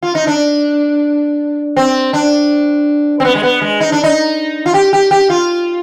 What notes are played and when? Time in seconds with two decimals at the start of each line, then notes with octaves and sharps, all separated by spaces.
0.03 F4
0.15 D#4
0.27 D4
1.76 C4
2.13 D4
3.20 C4
3.25 B3
3.35 G#3
3.43 B3
3.61 G#3
3.80 D#4
3.92 D4
4.04 D#4
4.66 F4
4.74 G4
4.93 G4
5.11 G4
5.30 F4